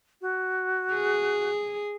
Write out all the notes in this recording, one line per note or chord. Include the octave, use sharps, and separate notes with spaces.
F#4
G#4